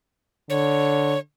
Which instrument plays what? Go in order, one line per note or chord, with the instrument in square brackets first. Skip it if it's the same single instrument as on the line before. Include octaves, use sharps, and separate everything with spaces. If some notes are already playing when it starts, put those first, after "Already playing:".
[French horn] D3 [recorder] C#5